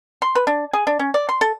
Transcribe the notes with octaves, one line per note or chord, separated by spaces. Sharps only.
C6
B4
D4
G#4
D4
C#4
D5
C6
A4